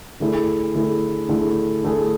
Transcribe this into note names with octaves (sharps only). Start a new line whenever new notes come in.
D3 A3 E4 G#4
D3 A3 E4 G#4
D3 A3 E4 G#4
D3 A3 E4 G#4